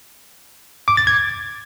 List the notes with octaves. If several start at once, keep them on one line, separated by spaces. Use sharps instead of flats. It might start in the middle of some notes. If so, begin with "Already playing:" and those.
D6
A6
G#6